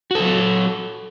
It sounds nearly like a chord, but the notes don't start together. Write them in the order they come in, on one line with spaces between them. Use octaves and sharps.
F#4 A4 F#3